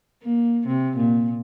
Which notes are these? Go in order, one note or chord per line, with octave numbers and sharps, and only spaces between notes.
A#3
C3
A#2